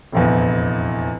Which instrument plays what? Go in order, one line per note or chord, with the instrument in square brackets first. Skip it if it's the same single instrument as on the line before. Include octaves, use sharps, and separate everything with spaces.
[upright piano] F1 A#1 E2